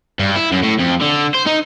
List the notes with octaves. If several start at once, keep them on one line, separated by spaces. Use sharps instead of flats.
G2
E4
F#2
A2
F2
D3
C5
D#4